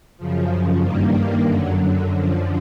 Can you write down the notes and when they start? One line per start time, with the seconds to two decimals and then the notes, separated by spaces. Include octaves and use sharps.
0.17 F#2 C#3 F3
0.80 G2 D#3 G3 A#3
1.43 F#2 D3 F#3
2.07 F#2 D3 F3